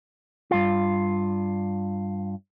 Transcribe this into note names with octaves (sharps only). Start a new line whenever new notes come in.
G2 F4